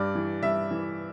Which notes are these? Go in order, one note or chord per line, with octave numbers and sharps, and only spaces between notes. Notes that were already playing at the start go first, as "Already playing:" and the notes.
Already playing: G2 D5
E3
G2 E5
E3